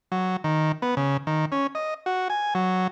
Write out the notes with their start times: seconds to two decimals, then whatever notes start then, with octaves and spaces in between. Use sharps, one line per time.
0.12 F#3
0.44 D#3
0.82 B3
0.97 C#3
1.27 D#3
1.52 C#4
1.75 D#5
2.06 F#4
2.30 G#5
2.55 F#3